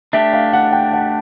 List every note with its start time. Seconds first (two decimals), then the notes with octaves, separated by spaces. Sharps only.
0.13 A3 D4 G4 E5
0.33 F5
0.53 F#5
0.73 G5
0.93 F#5